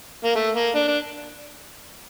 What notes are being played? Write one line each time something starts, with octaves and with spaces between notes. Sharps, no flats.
A#3
A3
A#3
D4
D4